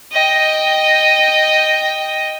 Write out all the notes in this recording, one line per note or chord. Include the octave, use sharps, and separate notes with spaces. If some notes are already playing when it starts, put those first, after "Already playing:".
D#5 G5